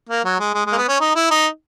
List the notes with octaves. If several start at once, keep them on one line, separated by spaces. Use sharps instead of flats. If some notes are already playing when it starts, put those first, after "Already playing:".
A#3
F#3
G#3
G#3
G#3
A#3
B3
C#4
D#4
E4
D#4